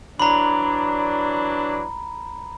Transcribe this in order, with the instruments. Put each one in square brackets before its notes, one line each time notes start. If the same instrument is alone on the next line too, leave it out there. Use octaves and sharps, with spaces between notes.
[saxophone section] E3 F#3 D4 [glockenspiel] A#5 B5